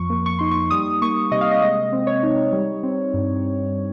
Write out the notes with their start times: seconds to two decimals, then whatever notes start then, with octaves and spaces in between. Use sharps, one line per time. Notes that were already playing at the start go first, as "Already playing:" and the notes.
Already playing: F2 F3 C#6
0.10 A#3
0.26 C#6
0.39 D#4 C6
0.51 C#6
0.70 G3 D#6
1.02 A#3 C#6
1.31 C3 D#5
1.41 F5
1.51 D#5
1.62 G#3 D#5
1.93 C4
2.07 C#5
2.23 D#4
2.53 G3
2.83 C4
3.14 G2